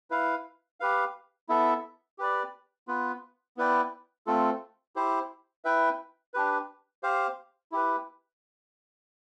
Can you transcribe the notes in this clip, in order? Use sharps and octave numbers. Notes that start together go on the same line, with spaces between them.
E4 B4 F5
G4 B4 F5
B3 E4 A4 E5
G4 B4 D5
B3 F4 B4
B3 E4 B4 D5 G5
A3 C4 F4 A4
E4 G4 C5
E4 B4 E5 G5
D4 G4 B4
G4 C5 F5
E4 G4 B4